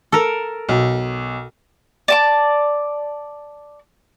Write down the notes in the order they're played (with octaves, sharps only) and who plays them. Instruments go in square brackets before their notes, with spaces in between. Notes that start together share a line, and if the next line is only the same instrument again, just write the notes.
[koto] A4 A#4
[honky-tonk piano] B1
[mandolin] D5 A5 D6